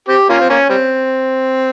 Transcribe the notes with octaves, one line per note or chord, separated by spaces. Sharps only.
C4 G4
A#3 C#4 F4
C4
A#3 C#4
G3 C4